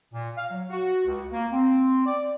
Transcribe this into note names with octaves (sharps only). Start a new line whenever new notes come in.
A#2
F5
F#3
F#4
C#2
A#3
C4
D5